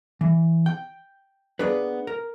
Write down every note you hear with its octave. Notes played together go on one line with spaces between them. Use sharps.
E3
G5
A#3 B3 D4 G#4 B4
A#4